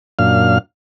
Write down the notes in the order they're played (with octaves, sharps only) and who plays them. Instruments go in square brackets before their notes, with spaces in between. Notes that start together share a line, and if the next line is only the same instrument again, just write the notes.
[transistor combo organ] F#2 A#2 D4 F5 F6